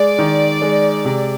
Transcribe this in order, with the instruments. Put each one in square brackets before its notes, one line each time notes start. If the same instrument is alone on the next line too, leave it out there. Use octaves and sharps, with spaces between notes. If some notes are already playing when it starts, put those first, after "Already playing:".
Already playing: [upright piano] G#3 [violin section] D5
[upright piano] D#3
G#3
C3